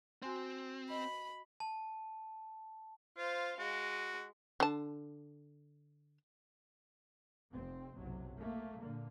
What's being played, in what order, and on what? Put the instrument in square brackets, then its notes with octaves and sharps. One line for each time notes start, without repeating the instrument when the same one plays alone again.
[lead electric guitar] C4 [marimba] F#4 G#5 C6
[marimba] D#5 [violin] B5
[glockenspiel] A5
[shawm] F4 [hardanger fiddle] C5 F5
[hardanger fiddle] G#3 [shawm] F#4
[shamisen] D3 A5
[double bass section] F1 C4
F#1 B1 C3 F#3
A3 A#3
A#2 D3 A#3